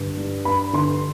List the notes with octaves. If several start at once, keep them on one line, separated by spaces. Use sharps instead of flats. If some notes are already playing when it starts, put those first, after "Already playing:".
Already playing: G2 D3
G3
G2 B5
D3 C6